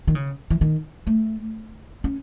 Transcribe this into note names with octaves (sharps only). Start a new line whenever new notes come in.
D#3
C#3
E3
D#3
A3
C#4